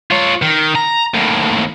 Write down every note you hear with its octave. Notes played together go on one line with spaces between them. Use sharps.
F4 C#5
D#3
A#5
D#2 A2